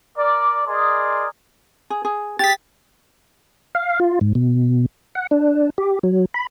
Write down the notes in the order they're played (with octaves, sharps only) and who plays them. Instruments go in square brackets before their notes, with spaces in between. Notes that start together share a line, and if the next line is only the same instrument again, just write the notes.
[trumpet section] A#4 D5
G#4 A#4 D5 D#5 C6
[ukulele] G#4
G#4
[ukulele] G4 G#4 [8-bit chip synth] A6 B6
[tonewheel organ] F5
F4
G#2
B2
F#5
D4
G4
F#3
B5